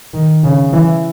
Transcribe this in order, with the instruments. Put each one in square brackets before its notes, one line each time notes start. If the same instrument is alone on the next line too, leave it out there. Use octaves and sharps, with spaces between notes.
[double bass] D#3
C#3
E3